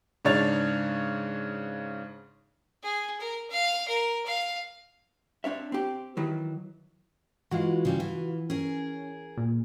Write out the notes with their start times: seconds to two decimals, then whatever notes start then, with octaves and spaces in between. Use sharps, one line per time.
0.25 G#2 C#3 D4 C#5 A6 F7
2.83 G#4
3.20 A#4
3.50 F5
3.88 A#4
4.26 F5
5.44 C4 D4 C#5 E5
5.72 C4 G4
6.17 D#3 E3 F#3
7.51 E3 G#3 F4 F#4
7.85 C#3 G3 D4
8.00 E3
8.50 C#4 G#4 A#4
9.37 A#2